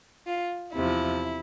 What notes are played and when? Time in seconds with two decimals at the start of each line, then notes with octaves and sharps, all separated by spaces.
0.27 F4
0.74 E2 C3 F3 E4